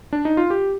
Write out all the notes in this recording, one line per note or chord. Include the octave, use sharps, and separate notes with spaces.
D4
D#4
F4
G4